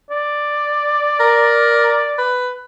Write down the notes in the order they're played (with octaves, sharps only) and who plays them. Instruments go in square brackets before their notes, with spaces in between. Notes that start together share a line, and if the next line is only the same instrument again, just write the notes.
[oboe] D5
[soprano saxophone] A#4
B4